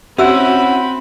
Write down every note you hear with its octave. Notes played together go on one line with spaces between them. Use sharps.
C4 C#4 E4 F#4 E5 B5 E6